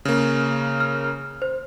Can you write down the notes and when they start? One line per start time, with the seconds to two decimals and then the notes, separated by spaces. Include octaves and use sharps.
0.05 C#3 A#3
0.80 F6
1.42 C5